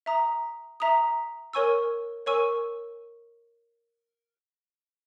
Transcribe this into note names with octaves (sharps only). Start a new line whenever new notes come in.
E5 A#5 D#6
E5 A#5 D#6
A#4 C#5 G#5 C#6 E6
A#4 C#5 G#5 C#6 E6